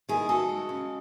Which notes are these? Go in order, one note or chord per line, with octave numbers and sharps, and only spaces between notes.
D#3 E4 G#4
D#3 F#4 A4
G#3
C#3